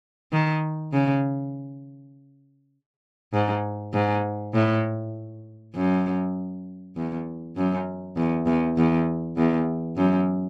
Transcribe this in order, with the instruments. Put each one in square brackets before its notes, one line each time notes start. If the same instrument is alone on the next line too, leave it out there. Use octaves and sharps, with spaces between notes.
[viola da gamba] D#3
C#3
G#2
G#2
A2
F#2
E2
F#2
E2
E2
E2
E2
F#2